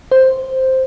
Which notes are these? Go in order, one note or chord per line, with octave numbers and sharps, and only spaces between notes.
C5